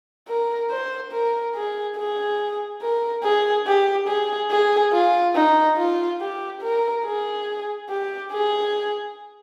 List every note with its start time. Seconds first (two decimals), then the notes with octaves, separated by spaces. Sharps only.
0.28 A#4
0.70 C5
1.12 A#4
1.55 G#4
1.97 G#4
2.82 A#4
3.24 G#4
3.67 G4
4.08 G#4
4.51 G#4
4.93 F4
5.35 D#4
5.77 F4
6.20 G4
6.61 A#4
7.05 G#4
7.89 G4
8.31 G#4